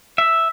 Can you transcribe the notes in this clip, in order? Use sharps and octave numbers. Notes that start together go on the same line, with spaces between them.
E5